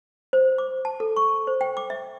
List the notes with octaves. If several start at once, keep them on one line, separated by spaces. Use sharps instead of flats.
C5
D6
A5
A4
C#6
C5
G5
D6
E5